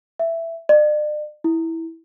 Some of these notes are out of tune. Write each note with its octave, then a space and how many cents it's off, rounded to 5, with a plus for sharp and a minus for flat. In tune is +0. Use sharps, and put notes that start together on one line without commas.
E5 +10
D5 +40
E4 -10